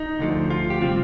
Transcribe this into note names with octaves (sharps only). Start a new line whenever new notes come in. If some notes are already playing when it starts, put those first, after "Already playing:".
Already playing: D#4
D2 D3 F3
F4
G4
C3 G3 C4 F4